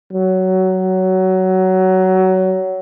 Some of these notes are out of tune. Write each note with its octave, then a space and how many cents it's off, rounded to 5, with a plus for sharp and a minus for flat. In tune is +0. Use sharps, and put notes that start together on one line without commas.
F#3 +15